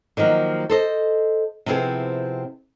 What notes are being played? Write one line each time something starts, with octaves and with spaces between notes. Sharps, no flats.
D3 D#3 F3 F#3 A#3
A4 C5 D#5
C3 F3 B3 C4 E4 G#4